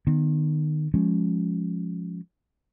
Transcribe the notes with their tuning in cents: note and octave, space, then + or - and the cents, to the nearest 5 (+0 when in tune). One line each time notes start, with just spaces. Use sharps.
D#3 -30 B3 +0
F3 +10 G#3 +0 C#4 +0